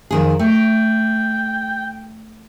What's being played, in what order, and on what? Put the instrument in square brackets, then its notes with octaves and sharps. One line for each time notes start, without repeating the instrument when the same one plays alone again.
[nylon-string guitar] F2 D#3 G#4
[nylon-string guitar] A3 [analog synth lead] G5